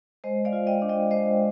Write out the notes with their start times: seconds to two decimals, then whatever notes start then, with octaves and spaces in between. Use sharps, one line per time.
0.24 G#3 C5 D#5
0.45 D5 F5
0.53 F4
0.67 D#5 G5
0.82 D4
0.89 D#5 G5
1.11 G#3 C5 D#5